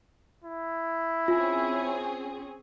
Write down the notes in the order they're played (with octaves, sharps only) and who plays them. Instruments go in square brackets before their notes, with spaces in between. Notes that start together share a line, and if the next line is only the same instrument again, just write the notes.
[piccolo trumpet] E4
[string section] C4 C#4 G#4 [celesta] F4